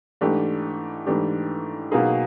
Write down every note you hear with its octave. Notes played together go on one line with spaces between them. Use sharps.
G#2 E3 A3 D4 G4
G#2 E3 A3 D4 G4
B2 F#3 A#3 D#4 G#4